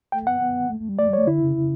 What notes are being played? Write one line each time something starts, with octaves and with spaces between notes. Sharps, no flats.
A3 G5
B3 F#5
B3
A3
A3
G3
A3 D5
G3
C#5
A3
D3 E4
C#3
C#3